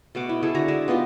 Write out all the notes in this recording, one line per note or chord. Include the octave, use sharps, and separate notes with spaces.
B2 A3 F#5 D6
E4
A3 E4 G#4 A4
D3 F#4 A#5 D6
G#3 D4 E5
B3 D#4 F4 G4